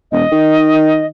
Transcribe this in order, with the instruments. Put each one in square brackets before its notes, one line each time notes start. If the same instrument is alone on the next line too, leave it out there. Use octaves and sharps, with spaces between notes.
[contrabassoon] E1 [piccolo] D#5
[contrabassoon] D#3